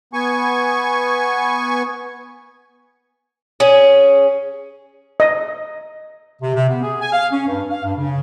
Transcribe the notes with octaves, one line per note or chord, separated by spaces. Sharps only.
B3 G#5 C#6
C#4 G#4
D#5
C3
C3
B3
G#4
G#5
F5
C#4
G2
F5
G2
C#3